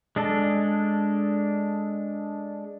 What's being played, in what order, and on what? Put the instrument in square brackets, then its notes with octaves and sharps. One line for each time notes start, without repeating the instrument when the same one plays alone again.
[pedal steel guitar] G#3 D4 A4